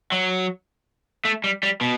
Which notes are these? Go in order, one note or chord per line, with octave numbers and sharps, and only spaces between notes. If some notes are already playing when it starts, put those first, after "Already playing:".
F#3
A3
G3
G3
B2